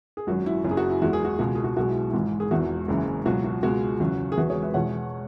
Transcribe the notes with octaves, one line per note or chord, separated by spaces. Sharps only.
G#4
G#1 F#2 F#3 F#4
E4
F#1 F#2 F#3 E4
G#4
F#4
E4
E2 E3 G#3 F#4
G#4
F#4
C#2 B2 G#3 F#4
G#4
F#4
B1 B2 G#3 F#4
E4
G#1 G#2 E3 G#3 E4
G#4
E1 E2 E3 F#4
F#1 F#2 C#3 E3 G#3
C#2 B2 F#3 F#4
F#4
C#2 B2 G#3 F#4
E2 C#3 F#3
G#4
E1 E2 E3 G#3 F#4 B4
G#4 C#5
B4 E5
E2 B2 G#3 C#5 F#5